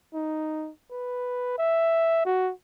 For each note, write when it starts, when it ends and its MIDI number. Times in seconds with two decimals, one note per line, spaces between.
0.14 0.70 63
0.91 1.55 71
1.58 2.22 76
2.25 2.52 66